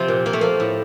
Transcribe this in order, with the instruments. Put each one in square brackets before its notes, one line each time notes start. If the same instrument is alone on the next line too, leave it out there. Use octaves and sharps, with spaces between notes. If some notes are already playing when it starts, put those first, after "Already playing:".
Already playing: [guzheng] C3 F3 C4
A#2
F3 A#3
A3
F3 A#3
A2